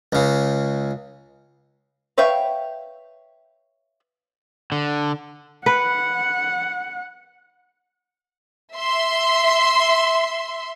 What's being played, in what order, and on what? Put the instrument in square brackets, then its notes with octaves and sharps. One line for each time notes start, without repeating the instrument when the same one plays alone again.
[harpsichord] C#2 C#3
[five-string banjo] B4 C#5 E5 F5 G5
[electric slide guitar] D3
[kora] B4 [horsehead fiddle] F#5
[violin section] E5 C6